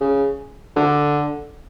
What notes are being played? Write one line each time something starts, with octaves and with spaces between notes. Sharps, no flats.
C#3
D3